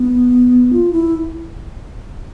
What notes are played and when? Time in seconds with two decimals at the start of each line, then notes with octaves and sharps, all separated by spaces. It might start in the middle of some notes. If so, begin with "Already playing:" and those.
Already playing: B3
0.73 F4
0.93 E4